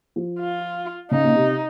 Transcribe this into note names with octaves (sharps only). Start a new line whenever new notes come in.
F3
F4
C#3 D#4
A#2
C3